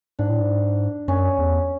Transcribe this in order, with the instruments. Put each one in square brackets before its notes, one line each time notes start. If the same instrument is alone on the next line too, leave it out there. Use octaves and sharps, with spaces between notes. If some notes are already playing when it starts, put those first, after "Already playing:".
[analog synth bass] G#2 [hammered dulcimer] D4
[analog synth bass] A2
G#2
[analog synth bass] F#2 [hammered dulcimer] C#4
[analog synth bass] E2